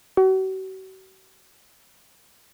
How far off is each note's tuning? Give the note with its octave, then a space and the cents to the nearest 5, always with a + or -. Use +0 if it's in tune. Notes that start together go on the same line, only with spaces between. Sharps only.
F#4 +45